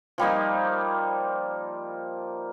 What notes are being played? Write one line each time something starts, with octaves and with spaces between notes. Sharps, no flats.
F3 G3 A#3 D#4